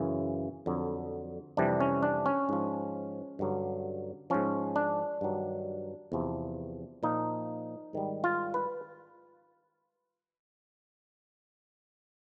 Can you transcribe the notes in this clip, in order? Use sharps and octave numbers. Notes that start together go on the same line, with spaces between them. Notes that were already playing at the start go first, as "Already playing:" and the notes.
Already playing: F#2 C#3 E3
F2 D3 F#3
F2 C3 E3 G3 D4
C#4
D4
C#4
G#2 F3
G2 D3 F#3
G#2 F3 C#4
D4
G2 D#3 F#3
E2 C3 F3
A#2 F3 D#4
G#2 D#3 G3
F4
B4